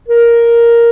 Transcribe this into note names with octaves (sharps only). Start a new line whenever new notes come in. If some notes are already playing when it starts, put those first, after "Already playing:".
A#4